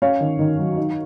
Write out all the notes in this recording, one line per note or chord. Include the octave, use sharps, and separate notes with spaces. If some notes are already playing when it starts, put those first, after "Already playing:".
C#4 C#5 F5
D#3
D#3
F#3
D#4